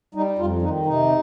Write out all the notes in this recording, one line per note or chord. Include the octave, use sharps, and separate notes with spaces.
G3 D#4
F2 F4
D#3 D#4
C3 D#4